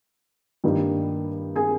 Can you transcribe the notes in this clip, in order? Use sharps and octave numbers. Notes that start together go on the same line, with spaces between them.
G2 D#3 G3 A#3 D#4
G#4 G#5